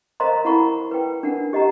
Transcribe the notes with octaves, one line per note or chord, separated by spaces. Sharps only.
A#4 C5 D#5 F5 A#5 C6
E4 A#4 F#5 A#5 B5 C#6
B4 G5
D4 A#4 F#5
G4 D#5 F#5 A#5